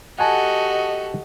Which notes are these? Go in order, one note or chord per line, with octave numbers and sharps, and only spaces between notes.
F#4 G4 A4 D#5 F#5 G#5 A5